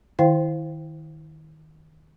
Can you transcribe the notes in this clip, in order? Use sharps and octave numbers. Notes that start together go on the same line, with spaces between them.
D#3 E4 C5 F5 G5